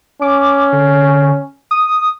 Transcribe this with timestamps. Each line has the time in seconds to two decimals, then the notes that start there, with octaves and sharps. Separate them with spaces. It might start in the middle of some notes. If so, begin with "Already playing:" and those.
0.22 C#4 D6
0.73 D3
1.71 D#6